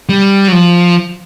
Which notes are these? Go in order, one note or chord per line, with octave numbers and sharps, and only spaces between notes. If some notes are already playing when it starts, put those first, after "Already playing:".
G3
F#3
F3